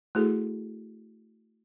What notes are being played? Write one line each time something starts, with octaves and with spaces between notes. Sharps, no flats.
A3 E4 F#4 G#4 A4